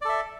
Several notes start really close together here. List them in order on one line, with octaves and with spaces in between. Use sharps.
D5 A4 E5